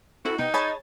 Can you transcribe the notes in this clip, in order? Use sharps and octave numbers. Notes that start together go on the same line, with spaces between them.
C4 E4 F#4 G#4 A4
C3 B3 D#4 D#5 G5
G#4 C#5 A5 B5 G#6 A6